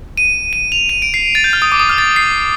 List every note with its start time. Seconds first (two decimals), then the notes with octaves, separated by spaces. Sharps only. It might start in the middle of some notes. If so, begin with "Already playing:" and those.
0.17 D#7
0.53 D#7
0.72 F7
0.89 D#7
1.02 D7
1.14 C7
1.35 A6
1.44 G6
1.53 F6
1.62 D#6
1.72 D6
1.80 D#6
1.89 F6
1.98 A6
2.16 C7